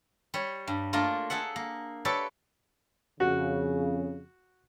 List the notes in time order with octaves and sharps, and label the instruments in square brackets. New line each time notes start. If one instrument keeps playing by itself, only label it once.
[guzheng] G3 C#5
G2
A3 A#3 D4 F4 A#4
G#4 A4 E5 F#5
A#3
G4 A4 B4 C#5 D5 E5
[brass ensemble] F2 C#3 [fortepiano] F#4